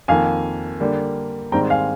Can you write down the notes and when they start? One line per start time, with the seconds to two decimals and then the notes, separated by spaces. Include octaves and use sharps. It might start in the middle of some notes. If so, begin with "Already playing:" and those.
0.08 F2 D#3 A#3 F5 G#5
0.80 D3 G3 A#3
1.52 G#2 D#3 G3 C4 G5 A#5
1.70 F5 G#5